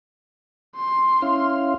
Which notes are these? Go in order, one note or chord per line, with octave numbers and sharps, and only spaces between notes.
C6
C#4 E4 F5